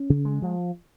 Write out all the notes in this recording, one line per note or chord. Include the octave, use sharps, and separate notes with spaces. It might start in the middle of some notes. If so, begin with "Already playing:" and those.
Already playing: C#4
C#3
G#3
F3